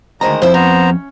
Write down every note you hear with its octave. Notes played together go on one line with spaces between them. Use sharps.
D2 D#3 G#3 A#3 C5 D#5 A#5
F2 E4 C5
B3 C#4 C5 A#5